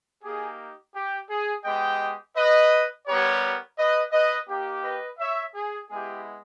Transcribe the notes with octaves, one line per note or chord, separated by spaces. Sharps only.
A#3 D#4 G4 G#4
G4
G#4
G#3 B3 G4 D#5 G5
B4 D#5
G3 B3 G4 A#4 C#5
B4 D#5
B4 D#5
A#3 D#4 G4
B4 D#5
C#5 E5
G#4
G#3 B3 E4 G4 G#4